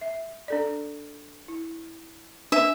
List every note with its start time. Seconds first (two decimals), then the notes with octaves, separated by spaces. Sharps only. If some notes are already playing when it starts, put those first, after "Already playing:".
0.01 E5
0.48 D4 A4 D5
1.48 E4
2.52 D4 E5